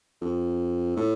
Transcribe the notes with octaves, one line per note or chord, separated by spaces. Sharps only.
F2
A2